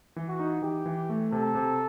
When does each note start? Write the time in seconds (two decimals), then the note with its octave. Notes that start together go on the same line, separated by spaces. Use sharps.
0.16 E3
0.28 F#4
0.39 D#4
0.62 E3 G4
0.86 E3
1.09 A3
1.32 C3 A4
1.55 C3